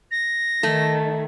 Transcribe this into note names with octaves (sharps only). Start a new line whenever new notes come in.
A#6
D#3 A3